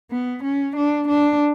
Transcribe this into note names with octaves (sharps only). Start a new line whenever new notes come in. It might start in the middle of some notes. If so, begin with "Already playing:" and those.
B3
C#4
D4
D4